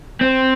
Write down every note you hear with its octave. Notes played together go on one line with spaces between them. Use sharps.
C4